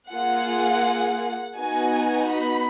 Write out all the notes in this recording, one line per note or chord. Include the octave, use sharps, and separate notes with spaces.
A#3 F4 G#4 F#5
B3 D#4 F#4 G#5
B5